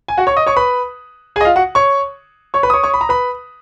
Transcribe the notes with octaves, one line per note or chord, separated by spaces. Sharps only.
G#5
F#4 F#5
C#5 C#6
D#5 D#6
C#5 C#6
B4 B5
G#4 G#5
D#5
F4 F5
F#4 F#5
C#5 C#6
C#5 C#6
B4 B5
D#6
C#5 C#6
C#5 C#6
B5
A#5
B4 B5